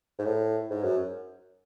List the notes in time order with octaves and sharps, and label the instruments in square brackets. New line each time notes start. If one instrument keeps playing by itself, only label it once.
[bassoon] G#2
A2
G#2
F#2